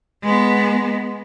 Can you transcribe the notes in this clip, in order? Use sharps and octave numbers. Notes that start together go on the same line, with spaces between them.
G#3 B3